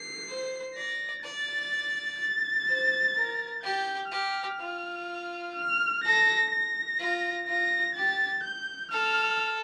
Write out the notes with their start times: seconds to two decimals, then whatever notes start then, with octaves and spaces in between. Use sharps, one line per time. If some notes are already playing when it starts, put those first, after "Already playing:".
Already playing: C7
0.28 C5
0.76 D5 A#6
1.24 D5 A6
2.19 A6
2.68 C5
3.15 A#4
3.63 G4 G6
4.11 G4 F6
4.59 F4
5.55 F6
6.04 A4 A#6
6.51 A#6
6.99 F4
7.47 F4 A#6
7.95 G4 A6
8.43 G6
8.91 A4 F6